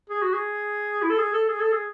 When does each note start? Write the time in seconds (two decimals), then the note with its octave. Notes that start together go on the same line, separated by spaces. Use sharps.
0.10 G#4
0.22 F#4
0.34 G#4
1.02 E4
1.10 A4
1.18 G#4
1.33 A4
1.48 G#4
1.60 A4
1.72 G#4